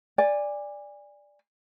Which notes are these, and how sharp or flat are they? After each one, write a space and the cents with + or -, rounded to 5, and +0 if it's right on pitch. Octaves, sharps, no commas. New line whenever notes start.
D5 +0 G#5 -30